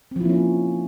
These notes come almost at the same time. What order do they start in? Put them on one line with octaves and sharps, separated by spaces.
C4 F3 E4 A#3 C#4